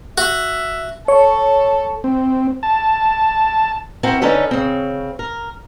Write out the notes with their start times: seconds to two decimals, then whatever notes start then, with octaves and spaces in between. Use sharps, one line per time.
0.18 F#4 E5
1.08 A4 C#5
2.04 C4
2.63 A5
4.03 C4 E4 F#4 A#4 C5
4.22 D3 C#4 D#4 A4 B4
4.51 C#3 C4
5.19 A#4